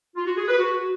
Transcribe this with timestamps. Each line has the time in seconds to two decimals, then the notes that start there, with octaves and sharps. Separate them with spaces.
0.16 F4
0.27 F#4
0.37 G#4
0.48 B4
0.59 F#4